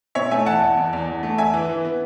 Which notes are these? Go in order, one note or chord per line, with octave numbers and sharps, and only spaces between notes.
B2 C#5 E5
A3 E5 G#5
E2 F#5 A5
E2
E2
E2
E2
A3
E2 E5 G#5
E3
E3
B3